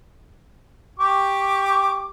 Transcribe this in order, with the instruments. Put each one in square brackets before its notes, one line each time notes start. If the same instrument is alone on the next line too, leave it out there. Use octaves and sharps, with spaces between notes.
[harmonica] G4 C#6 D6